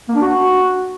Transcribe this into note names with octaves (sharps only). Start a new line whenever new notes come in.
A#3
D4
F#4